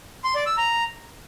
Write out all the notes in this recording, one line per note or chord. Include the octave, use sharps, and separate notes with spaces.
C6
D5
E6
A#5